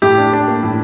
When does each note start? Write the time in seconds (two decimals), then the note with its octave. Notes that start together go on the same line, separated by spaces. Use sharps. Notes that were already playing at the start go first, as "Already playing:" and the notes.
0.02 A2 G4
0.18 D4
0.33 D4
0.48 A#3
0.63 A2